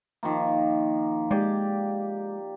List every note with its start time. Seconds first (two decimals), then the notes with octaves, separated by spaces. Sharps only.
0.23 D#3 F3 A#3
1.31 G#3 G4 D5